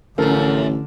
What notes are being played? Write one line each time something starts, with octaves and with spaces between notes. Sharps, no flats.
A1 F#2 D3 F3 A4 A#4